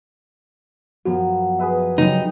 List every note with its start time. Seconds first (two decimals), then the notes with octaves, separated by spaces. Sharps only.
1.05 F#2 F3 B3 F#4
1.59 G#4 B4 E5
1.98 G2 C#3 F#3 D#4